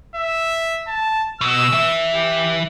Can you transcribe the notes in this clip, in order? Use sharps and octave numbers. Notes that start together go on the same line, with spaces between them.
E5
A5
B2 E6
E3 E5
G4